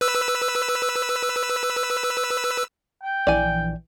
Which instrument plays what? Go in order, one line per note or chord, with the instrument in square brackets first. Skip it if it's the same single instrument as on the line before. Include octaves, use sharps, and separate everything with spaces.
[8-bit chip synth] B4 E6
[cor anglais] G5
[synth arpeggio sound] A#1 E3 [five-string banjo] D5 G#5